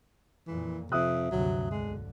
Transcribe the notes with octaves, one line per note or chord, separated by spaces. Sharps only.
F2 A#2 E3
F2 C3 E5 D#6 F#6
D2 G2 C3 F#3
B1 D3 G#3